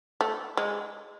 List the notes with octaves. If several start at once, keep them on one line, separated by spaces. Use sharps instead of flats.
A3
G#3